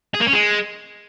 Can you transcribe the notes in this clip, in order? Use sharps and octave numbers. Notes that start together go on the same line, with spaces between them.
G#4
A#3
C#4
G#3